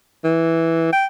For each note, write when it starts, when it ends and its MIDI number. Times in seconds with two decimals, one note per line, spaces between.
0.24 0.92 52
0.93 1.06 79